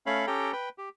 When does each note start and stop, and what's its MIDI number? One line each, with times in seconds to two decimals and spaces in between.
0.06 0.26 57
0.06 0.26 61
0.06 0.26 73
0.06 0.26 77
0.06 0.26 83
0.27 0.52 61
0.27 0.52 67
0.27 0.52 69
0.27 0.52 79
0.27 0.52 82
0.53 0.69 71
0.53 0.69 79
0.78 0.89 67